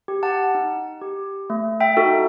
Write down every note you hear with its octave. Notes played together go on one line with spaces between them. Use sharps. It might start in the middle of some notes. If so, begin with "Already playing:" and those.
G4
F#5 A5
D#4
G4
A3
E5 G5
D#4 F#4 A4